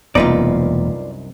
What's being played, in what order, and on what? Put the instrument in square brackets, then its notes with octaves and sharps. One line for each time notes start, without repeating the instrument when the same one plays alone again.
[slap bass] E1 A#3 [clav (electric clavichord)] C2 F#2 D#4 [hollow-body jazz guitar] F4 B4 D5